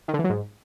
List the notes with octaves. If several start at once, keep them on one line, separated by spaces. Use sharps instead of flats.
D#3
D3
E3
F#3
G#2